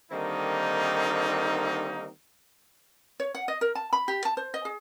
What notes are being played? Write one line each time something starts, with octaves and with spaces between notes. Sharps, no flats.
D3 D#3 G3 A#3 C4 D#4
C#5
F#5
D#5
A#4
A5
B5
G4
A5
C5
D#5
G#4